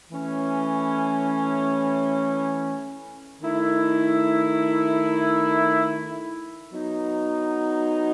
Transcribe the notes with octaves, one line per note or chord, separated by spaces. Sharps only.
E3 A3 C#4
D#3 A3 E4
F#3 B3 D#4